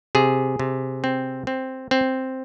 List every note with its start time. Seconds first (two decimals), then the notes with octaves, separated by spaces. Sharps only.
0.15 C3 G#4
0.59 C3
1.04 C4
1.47 C4
1.91 C4